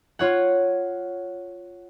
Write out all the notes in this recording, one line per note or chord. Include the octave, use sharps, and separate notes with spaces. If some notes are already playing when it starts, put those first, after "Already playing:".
F4 C#5 F#5